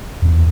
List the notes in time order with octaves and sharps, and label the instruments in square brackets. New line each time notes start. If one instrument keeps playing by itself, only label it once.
[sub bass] E2